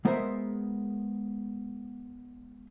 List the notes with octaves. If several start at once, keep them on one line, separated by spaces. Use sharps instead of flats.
G#3 B3 G#4 A#4 C5 E5